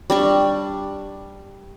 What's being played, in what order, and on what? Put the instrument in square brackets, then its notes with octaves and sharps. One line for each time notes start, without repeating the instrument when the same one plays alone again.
[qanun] G3 D4 C#6